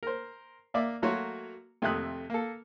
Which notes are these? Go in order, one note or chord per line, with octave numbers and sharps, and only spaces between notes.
A#4 C5
A#3 D5 E5
F#3 A3 A#3 F#4 C#5 C6
F2 C3 A3 E5 D#6 F#6
A#3 A4